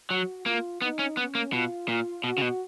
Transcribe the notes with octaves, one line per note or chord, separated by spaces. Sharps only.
F#3 F#4
A#3 F4
B3 D#4
C#4
B3 C#4
A#3
B2 F4
A#2 F4
B2 F#4
C#3
B2